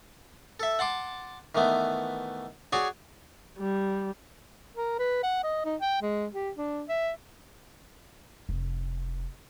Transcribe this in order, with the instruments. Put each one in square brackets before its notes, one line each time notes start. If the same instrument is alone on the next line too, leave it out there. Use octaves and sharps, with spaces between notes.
[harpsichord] A4 E5
F#5 A5 C6 D6
D#3 E3 A3 B3
F#4 G#4 C#5 D5 G#5
[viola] G3
[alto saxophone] A#4
B4
F#5
D#5
D#4
G5
G#3
G4
D4
E5
[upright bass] F1